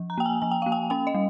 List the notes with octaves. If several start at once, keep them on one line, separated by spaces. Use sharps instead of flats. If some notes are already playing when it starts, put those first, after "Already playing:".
Already playing: F3
A#5
A#3 G5
G#5
F3 G#5
G5
A#3 F5
G5
C#4 G5
D#5
G3